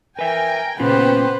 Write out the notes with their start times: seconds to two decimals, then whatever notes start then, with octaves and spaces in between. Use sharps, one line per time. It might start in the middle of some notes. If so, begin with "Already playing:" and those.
0.19 A#4 B4 E5 G5 G#5
0.80 A#2 C#3 B3 C#4 F4 G4 B4 C5